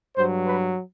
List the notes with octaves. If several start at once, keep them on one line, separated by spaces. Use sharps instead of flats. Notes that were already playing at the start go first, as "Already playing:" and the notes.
G2 F#3 C5
B4